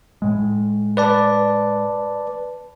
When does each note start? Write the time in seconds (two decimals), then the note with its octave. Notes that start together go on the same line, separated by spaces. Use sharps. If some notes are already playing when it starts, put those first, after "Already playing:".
0.22 A2 G#3
0.97 B4 D5 A5